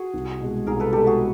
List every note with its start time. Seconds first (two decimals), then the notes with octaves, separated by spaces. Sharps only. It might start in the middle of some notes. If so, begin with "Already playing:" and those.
Already playing: F#4 G#4
0.14 C2
0.41 B2 G#3
0.67 C2 G#4 A#4
0.80 A4 B4
0.93 B2 G#3 G4 A4
1.06 F#4 G#4